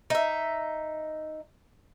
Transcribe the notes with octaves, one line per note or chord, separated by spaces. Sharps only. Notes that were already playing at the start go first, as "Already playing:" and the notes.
D#4 E5